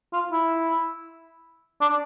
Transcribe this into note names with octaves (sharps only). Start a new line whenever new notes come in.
F4
E4
D4